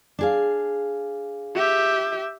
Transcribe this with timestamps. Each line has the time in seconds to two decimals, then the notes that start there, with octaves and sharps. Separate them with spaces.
0.19 D4 G#4 F5
1.55 G4 E5